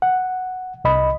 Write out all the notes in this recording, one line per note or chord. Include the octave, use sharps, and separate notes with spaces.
F#5
C2 D#5 B5